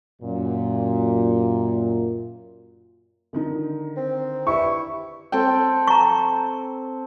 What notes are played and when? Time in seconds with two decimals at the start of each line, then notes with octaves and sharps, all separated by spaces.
0.22 F#2 A#2
3.33 D3 D#3 D#4
3.97 C4
4.47 E4 G4 B4 D5 C#6
5.32 C4 A4 G5
5.88 A#5 C#6